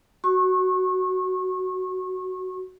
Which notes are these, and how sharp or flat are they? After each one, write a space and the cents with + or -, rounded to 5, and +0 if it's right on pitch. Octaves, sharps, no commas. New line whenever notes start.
F#4 +10 C#6 -30